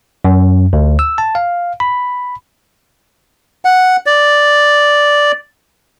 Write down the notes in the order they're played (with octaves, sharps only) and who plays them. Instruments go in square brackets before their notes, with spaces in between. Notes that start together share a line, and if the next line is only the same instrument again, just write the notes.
[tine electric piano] F#2
D2
E6
A5
F5
B5
[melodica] F#5
D5